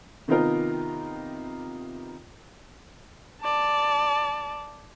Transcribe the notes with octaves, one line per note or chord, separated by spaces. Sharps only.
C3 D#3 B3 D#4 F4 A#4
D5 A5